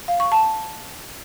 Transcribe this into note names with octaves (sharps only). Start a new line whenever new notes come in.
F5
C#6
A5